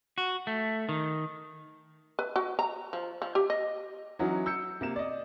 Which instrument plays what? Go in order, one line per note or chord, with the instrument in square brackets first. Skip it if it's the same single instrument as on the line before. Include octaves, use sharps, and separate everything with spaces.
[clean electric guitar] F#4
A3
D#3
[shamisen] B4
F#4
A#5
F3
F3
G4
D#5
[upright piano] E3 F#3 C#4 D#4 F#4
E6 G6 C#7
C3 A#3 E7
D5 D#5